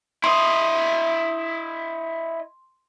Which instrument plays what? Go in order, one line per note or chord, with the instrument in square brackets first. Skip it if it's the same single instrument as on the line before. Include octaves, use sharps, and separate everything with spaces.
[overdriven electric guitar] E4 D#5 [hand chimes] C6